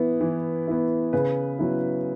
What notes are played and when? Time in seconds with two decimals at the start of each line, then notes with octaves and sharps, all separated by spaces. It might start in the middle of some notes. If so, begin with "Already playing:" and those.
Already playing: E3 B3 E4
0.21 E3
0.67 B3 E4
1.13 C#3 B4
1.59 F#3 B3 E4